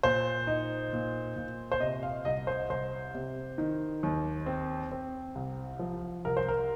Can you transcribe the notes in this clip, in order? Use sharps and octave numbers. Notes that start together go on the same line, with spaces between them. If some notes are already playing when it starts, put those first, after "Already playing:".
A#2 C5
D#4
A#2
A#2
C5
C3 D#5
F5
C2 D#5
C5
C2 C5
C3
D#3
D#2
C4
C4
C2
F3
C2 A#4
C5
A#4